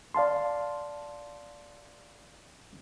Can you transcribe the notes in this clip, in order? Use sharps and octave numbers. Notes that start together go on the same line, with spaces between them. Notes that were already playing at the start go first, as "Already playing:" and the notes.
D5 F5 A5 C6